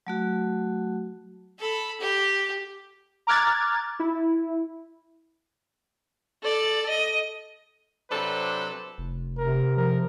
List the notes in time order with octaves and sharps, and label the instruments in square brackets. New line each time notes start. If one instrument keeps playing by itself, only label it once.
[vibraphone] F#3 A3 F#4
[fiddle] A4 B5
G4
[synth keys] A#5 D6 F6 F#6 G#6 A6
E4
[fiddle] A4 D5
D#5
[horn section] C3 F#3 D4 A4 B4 C5
[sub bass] F1
[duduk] C3 [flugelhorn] A#4
[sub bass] F3 [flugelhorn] A#4